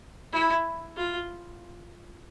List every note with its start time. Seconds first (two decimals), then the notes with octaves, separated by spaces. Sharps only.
0.33 E4
0.96 F4